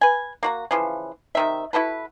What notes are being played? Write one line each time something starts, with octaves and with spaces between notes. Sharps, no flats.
B4 G#5
A#3 F#4 A#5
C#3 E3 F3
C3 D#3 E5
E4 F#4 A4 B4